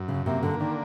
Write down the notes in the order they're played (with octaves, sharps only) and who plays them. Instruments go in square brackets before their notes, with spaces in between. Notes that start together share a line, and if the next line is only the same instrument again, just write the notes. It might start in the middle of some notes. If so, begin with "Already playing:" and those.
Already playing: [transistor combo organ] F#2
[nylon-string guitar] C#3
[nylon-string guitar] C3 [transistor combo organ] A#3
[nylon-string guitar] D3
[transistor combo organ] D3 [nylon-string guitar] D#3